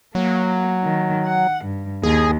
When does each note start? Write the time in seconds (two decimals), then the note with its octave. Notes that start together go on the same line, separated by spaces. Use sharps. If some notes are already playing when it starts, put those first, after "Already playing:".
0.15 F#3 A#3
0.84 D#3
1.26 F#5
1.65 G2
2.03 D#2 G#4